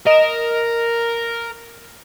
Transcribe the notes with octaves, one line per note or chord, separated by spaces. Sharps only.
A#4 D#5 E7